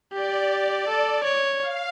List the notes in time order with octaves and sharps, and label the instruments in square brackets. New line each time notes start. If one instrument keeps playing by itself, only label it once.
[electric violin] G4 [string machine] D5
[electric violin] A4
C#5
[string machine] F5